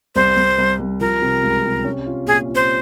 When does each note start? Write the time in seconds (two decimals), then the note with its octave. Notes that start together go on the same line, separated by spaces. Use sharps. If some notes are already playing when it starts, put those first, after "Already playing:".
0.15 C2 C5
0.37 C2
0.58 C2
0.80 C2
1.00 F3 A#4
1.22 C3
1.43 C#2
1.64 C3
1.85 C#4
2.06 F4
2.27 A#2 G#4
2.49 F4
2.55 C5